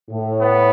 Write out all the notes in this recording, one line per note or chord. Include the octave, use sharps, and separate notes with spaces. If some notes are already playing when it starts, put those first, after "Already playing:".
A2
B3